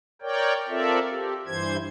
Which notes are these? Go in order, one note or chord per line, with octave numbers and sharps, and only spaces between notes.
A#4 C#5 D5 G5
C4 F4 A4 A#4 D5 E5
G4
G2 E3 C5 G#6